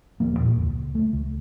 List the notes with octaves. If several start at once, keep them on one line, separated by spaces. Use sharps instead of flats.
D1 F3 A#3
E2 A#2
C#2
A3
C#2